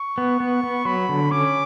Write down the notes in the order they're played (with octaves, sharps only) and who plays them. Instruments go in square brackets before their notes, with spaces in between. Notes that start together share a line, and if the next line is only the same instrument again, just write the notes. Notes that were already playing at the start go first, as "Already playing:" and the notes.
Already playing: [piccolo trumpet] C#6
[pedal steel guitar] B3
B3
B3
[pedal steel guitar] F#3 [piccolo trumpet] B5
[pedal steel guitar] D3
[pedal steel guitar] C#4 [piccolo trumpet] D6